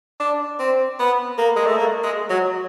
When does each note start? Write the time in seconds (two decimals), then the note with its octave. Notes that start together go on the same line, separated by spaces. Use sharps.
0.20 D4
0.59 C4
0.99 B3
1.38 A#3
1.56 G#3
1.67 A3
1.77 A#3
2.04 G#3
2.30 F#3